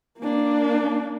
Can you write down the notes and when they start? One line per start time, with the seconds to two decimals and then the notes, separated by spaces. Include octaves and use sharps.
0.19 A#3 D4